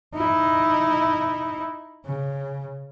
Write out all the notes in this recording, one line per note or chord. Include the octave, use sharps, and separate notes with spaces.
D#4 E4
C#3